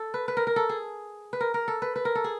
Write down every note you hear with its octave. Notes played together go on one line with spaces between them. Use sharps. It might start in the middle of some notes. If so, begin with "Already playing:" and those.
Already playing: A4
B4
B4
A#4
A#4
A4
G#4
B4
A#4
A#4
A4
B4
B4
A#4
A4
G#4